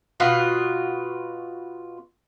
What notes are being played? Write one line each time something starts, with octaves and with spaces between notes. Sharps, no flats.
B2 F4 F#4